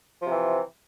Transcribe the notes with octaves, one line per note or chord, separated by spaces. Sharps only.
C3 E3 F3